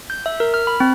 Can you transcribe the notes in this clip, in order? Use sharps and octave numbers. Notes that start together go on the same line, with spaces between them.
G6
E5
A#4
F6
B5
C4